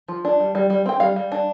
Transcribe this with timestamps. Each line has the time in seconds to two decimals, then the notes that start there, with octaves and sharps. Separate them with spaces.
0.08 F3
0.25 D4
0.40 G3
0.55 G3
0.70 G3
0.86 C4 G5
1.00 G3 F5
1.16 G3
1.32 D4